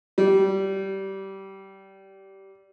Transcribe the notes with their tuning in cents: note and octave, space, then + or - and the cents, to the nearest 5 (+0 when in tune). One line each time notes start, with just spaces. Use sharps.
G3 -20